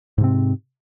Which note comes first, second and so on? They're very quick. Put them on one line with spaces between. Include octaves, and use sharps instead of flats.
G#2 C3 C4